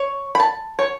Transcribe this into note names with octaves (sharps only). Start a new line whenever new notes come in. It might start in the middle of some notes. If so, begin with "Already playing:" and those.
Already playing: C#5
B5
A5
C#5